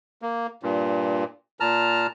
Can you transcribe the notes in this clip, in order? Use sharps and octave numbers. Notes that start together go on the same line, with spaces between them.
A#3
G2 A#2
A#2 A5 A#5 F6